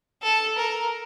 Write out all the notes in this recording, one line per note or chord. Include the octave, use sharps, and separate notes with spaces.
A4
A#4